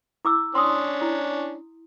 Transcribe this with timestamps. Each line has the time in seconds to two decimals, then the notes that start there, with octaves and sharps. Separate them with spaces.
0.25 E4 D6 E6
0.55 C#4 D4 C6 D#6
1.02 E4